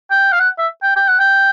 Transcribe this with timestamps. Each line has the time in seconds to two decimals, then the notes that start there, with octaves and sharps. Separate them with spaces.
0.10 G5
0.32 F5
0.39 F#5
0.58 E5
0.82 G5
0.96 G5
1.08 F#5
1.19 G5